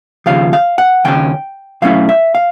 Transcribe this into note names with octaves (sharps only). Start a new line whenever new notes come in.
D#2 C#3 F3 C#4 F5
F5
F#5
D#2 C#3 C#4 G5
B2 F#3 A3 C#4 E4 F5
E5
F5